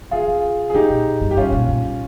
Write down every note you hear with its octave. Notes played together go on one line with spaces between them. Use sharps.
D#3 F4 G#4
C#3
G#4
C#3 D#4 G4
A#2
G2
G4
G2 C#4 F4
A#2
G2